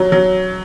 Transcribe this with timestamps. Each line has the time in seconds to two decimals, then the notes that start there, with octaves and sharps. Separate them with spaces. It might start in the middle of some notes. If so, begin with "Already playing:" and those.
Already playing: F#3
0.12 F#3